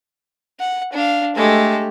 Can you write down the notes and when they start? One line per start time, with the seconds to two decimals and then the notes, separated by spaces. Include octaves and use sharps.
0.59 F#5
0.93 D4 F5
1.36 G#3 A3 G4 A4